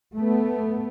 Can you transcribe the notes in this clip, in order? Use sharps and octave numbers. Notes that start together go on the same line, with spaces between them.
A3 B3